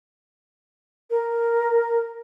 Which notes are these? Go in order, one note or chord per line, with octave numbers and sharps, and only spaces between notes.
A#4